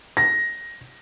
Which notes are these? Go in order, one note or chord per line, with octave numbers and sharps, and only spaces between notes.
A#6